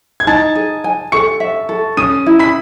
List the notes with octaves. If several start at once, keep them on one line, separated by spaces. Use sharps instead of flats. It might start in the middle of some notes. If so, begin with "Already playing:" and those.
G#6
D#4 A5 A6
G#4
G#5
A4 C#6 C#7
E5
A4
C#4 D#6 D#7
E4
B5 B6